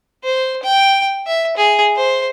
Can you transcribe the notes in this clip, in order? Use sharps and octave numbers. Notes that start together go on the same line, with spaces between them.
C5
G5
E5
G#4
C5